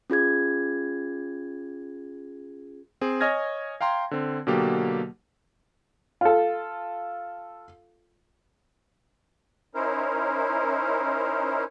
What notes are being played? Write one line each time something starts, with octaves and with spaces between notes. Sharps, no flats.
C#4 F4 G#4 G#6
C4 G#4
C#5 D#5 G#5 F6 G#6 A#6
F5 G5 A#5 C6
D3 C4
B2 D3 F#3 A#3 G4
F4 A4
C#4 D#4 E4 A#4 C5